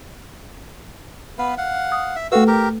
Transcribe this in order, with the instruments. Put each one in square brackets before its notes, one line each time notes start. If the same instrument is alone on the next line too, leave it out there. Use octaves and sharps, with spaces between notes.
[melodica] B3 B4 F5
F5 F#5
[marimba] D#6
[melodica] E5
[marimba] A3 A4 B4 [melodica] F#4 F5 E6
[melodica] G4 A#4